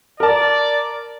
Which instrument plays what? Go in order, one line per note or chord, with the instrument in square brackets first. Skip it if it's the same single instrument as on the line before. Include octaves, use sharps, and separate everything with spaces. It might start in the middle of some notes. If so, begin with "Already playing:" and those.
[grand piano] A#4 A5 [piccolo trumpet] D5